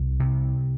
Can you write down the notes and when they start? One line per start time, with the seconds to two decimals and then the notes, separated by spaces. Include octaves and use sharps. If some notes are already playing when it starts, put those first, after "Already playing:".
Already playing: C2
0.20 C3